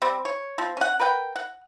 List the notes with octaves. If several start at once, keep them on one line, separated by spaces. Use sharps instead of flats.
G3 C4
C#5
F3 C4
C#4 F#5
A#4 B4 F#5 G5
F#5